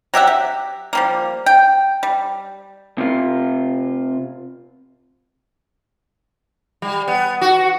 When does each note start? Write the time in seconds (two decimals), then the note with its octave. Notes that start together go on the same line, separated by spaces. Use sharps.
0.14 F#3 G4 E5 F#5
0.27 G4
0.93 F3 G3 A#3
1.46 G5
2.03 G3
2.98 C3 F4
6.82 G3
7.08 B3
7.41 F#4